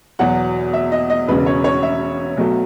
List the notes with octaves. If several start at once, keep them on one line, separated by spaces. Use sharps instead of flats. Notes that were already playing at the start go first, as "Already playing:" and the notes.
E2 B2 F#3 F#5
E5
D#5
D#5
E1 E2 C#3 B4
C#5
C#5
E5
B1 B2 F#3 A3